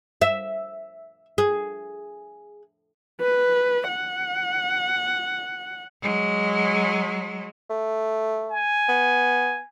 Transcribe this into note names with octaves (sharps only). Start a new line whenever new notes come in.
E5
G#4
B4
F#5
F#3 G#3
A3
G#5
B3